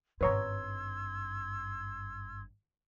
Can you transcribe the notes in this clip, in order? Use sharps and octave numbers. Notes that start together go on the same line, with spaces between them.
G#1 G2 B4 C#5 A#5 C6 E6 G#6